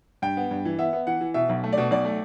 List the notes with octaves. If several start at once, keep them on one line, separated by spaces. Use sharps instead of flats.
G2 G5
B3
G2
E3
B3 E5
B3
E3 F#5
E3
B2 E5
B1
A3
D5
B2
B1 D5
A3